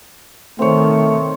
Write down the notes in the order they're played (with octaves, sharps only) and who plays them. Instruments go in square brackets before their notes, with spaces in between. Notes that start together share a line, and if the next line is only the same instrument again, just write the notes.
[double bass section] D#3 [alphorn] A3 [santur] C4 C#5